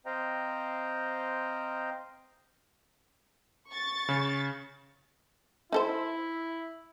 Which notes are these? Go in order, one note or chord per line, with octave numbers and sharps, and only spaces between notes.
C4 C5 D#5 F5 G5 A#5
C#6 A6
C#3
D#4 E4 A4 C5